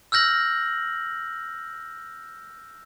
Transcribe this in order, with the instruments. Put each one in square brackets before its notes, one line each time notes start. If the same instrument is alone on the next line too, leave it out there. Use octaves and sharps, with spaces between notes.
[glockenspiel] E6 F6 G6 A#6 F#7